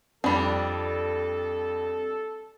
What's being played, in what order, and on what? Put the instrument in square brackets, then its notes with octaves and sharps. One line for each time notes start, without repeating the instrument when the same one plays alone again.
[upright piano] F2 B5 [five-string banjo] G3 D4 [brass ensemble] A4